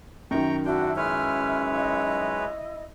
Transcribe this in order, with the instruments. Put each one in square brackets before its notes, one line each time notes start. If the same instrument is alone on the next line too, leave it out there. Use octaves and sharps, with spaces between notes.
[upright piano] F#2 D#3 [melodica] G5 A#5 C#6
[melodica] D4 G5 [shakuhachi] E4 [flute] F#4
[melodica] G#3 B4 C#5 [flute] F6
[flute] D#5